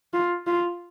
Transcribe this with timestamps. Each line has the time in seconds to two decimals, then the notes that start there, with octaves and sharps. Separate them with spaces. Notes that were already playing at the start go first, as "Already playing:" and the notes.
0.14 F4
0.47 F4